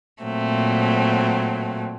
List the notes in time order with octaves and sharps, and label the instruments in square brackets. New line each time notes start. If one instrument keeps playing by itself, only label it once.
[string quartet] A#2 F#3 A3 C4